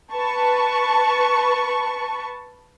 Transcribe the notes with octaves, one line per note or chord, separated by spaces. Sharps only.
B4 A5 C#6